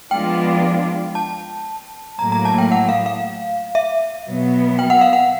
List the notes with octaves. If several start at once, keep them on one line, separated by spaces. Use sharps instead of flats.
F3 G#3 B3 D4 F4 G5
A5
A2 F#3 A#3 A#5
A#5
A5
G5
F#5
F5
F5
E5
B2 F#3 B3
G5
F#5
F5
F#5